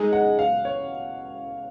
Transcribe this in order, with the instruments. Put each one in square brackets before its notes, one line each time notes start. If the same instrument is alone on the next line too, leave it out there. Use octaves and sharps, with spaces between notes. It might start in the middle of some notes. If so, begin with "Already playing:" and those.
Already playing: [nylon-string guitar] G#3 D#4 G#4
[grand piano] F#5
F5
C#5